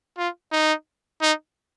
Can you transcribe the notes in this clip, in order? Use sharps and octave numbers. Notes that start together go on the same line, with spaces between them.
F4
D#4
D#4